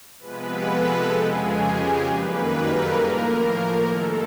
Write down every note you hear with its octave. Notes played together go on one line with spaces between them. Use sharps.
C3 F3 G#3 B3 B4
A4
F2 C#3 F3 G#3 G#4
G4
F#2 D#3 G3 A#3 B4
A#4
A4
A2 F3 A#3 A#4
G2 D#3 G#3 A4